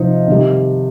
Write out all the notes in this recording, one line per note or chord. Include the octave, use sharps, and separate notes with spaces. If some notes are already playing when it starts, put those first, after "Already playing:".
Already playing: C3 F3 D#4
C3 D#3 G3